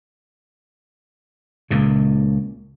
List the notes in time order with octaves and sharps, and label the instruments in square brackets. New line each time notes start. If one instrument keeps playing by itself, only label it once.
[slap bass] C#2 A#2 C#3